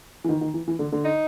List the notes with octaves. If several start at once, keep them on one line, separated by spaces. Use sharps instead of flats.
E3
D#3
D#3
E3
E3
D3
D3
D#4